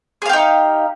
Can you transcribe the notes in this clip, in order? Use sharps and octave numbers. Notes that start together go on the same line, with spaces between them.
D#4 G4 G#4 F5